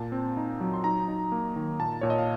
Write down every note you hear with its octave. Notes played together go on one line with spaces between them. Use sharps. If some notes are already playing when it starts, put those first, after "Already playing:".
Already playing: A#2 A5
C4
D#4
F#3
C6
D#4 A#5
D#4
A#3
D#3
A#2 A5
A#2 C#5
D#5
F5